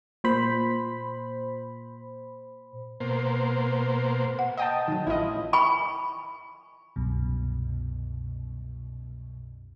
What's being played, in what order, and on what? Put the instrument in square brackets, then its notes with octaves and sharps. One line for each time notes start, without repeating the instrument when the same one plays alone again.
[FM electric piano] A#2 C5 B5
[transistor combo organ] B2 A#3 C5
[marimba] F#5
[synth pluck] D#5 G5 A5
[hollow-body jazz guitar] D#3 F#3
[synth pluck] A1 D#5 [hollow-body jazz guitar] E4 F4
[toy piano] G#5 B5 C#6
[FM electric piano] C2 F#2 B2